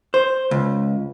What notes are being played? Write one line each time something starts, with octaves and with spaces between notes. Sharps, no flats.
C5
C#2